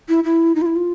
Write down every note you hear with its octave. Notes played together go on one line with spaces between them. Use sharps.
E4
E4
D#4
F4
E4
F4